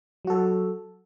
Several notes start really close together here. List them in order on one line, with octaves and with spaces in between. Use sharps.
F#3 F#4 A4